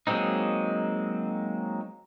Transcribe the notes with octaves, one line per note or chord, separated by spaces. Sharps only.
F#3 G#3 A#3 C4 D#4